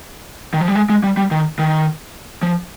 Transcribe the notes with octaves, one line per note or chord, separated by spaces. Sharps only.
D#3
F3
G3
G#3
G#3
G3
G3
D#3
D#3
F3